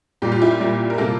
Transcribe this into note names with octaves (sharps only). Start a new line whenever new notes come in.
A#2 G3 A#3 G4
F4
E4 G4
A#2 G3 A#3
A#4
C3 G3 A#3 F4 A4